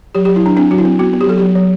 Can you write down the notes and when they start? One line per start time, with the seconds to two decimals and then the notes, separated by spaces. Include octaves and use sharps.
0.15 F#3 G4
0.25 G4
0.29 F#3
0.36 E4
0.43 F#3 D4
0.57 C4 D4
0.71 F#3 F#4
0.78 E4
0.85 C4
0.99 B3 F#4
1.13 B3
1.21 G4
1.27 F#3 A4
1.38 F#3 G4
1.55 F#3